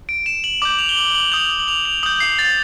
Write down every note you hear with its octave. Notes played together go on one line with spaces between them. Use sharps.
D7
E7
F#7
D6 G6 F#7
F7
G7
F#7
F#7
D#6 G6 F7
F#7
F7
F7
D#6 G6 F#7
C7
A6